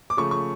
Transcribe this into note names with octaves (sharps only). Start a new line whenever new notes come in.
D6
C#3 F3 A3 C#6
C#6